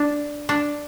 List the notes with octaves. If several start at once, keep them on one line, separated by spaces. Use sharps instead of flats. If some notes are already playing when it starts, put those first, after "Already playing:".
Already playing: D4
D4